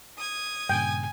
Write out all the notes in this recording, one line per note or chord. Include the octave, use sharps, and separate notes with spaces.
D#6 G#6
G2 A#2 C#3 G5 G#5